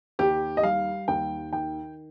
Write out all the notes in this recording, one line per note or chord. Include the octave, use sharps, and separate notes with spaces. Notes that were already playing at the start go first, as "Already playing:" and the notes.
D#2 G4
D#5
G3 F5
D#2 G5
D#3 G5